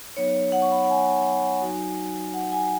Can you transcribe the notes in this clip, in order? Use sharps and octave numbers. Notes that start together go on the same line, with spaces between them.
F#3 B3 D#4 C#5
F#5
C#6
B5
F#5
G#5
F#3 D#4 F#4
F#5
G#5